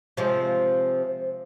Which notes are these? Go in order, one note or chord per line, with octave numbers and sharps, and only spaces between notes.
C3 F3 G#3